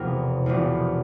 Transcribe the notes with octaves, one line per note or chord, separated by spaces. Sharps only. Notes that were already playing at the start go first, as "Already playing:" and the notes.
Already playing: E1 E2 C3 F3 G#3 A#4
E1 E2 C3 F3 G#3